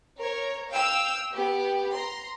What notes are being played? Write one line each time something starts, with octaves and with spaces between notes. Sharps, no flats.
A#4 C#5
F5 G5 E6
B3 G4
A#5 C6